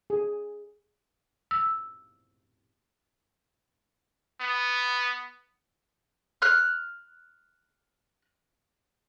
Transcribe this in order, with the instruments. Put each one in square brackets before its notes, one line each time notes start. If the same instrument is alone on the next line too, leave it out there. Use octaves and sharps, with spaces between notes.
[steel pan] G#4
[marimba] E6
[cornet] B3
[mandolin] F6 F#6